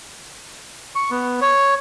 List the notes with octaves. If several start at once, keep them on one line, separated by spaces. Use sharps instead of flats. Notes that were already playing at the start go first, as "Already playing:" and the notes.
C#6
B3
C#5